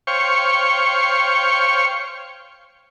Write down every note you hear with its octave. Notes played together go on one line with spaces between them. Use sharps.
C5 C#5 F5 G5 C#6